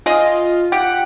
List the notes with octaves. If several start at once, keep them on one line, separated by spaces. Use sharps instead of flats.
F4 G#4 D#5
G4 F#5